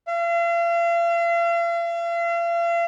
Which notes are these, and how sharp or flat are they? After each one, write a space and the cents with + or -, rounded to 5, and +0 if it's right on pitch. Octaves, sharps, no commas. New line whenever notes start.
F5 -40